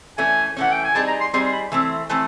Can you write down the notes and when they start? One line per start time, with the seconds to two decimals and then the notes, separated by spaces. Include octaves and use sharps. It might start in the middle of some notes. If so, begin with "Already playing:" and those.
0.18 E3 A3 C#4 G#5
0.57 E3 A3 C#4 F#5
0.72 G5
0.84 G#5
0.95 G3 C4 D#4 G#4 A5
1.07 A#5
1.21 C6
1.33 G3 C4 D#4 G#4 C6
1.46 C6
1.53 B5
1.72 E3 A3 C4
2.09 E3 A3 C4